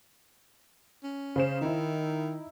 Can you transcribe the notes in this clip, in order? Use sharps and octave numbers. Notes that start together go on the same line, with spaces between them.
C#4
C#3 C5 E7
D#3 D#4 E4